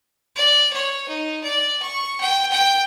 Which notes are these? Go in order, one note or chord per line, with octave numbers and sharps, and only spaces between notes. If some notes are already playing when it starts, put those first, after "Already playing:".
D5
C#5
D#4
D5
C#6
G5
G5